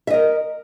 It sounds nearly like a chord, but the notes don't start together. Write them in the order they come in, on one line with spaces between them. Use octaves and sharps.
E5 D#5 A#4